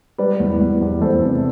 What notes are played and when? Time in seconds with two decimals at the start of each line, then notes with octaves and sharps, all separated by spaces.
0.18 G3 B4 D5
0.40 E2
0.60 E2
0.81 E2
1.01 E2 A4 C5
1.22 C3